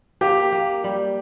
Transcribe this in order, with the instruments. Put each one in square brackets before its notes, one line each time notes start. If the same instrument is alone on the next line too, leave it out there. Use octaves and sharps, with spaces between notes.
[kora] A#3 [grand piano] G4
[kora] A#3
G3